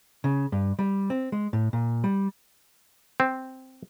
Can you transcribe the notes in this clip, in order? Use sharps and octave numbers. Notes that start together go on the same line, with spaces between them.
C#3
G2
G3
C4
G#3
A2
A#2
G3
C4